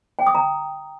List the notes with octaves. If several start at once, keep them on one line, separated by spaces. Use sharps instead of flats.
G5
D#6
A#5